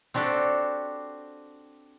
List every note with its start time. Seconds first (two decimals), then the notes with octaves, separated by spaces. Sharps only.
0.14 C4 D4 F#4 G4 A4